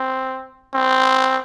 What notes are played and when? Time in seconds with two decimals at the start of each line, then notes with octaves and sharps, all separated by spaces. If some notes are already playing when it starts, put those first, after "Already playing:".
Already playing: C4
0.74 C4